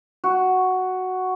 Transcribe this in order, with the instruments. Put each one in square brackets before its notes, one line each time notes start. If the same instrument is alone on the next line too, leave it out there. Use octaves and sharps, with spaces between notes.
[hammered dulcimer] F#4